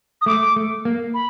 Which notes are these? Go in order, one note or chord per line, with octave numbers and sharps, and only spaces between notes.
D#6
A3 D6
A3
A#3
B5